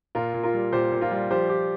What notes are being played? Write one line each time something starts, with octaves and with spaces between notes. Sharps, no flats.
A#2 F4 A#4
A#2
F4 A#4
G3
A#2 G4 C5
A#2
F4 A#4
G3
F3 G4 C5
F3 G4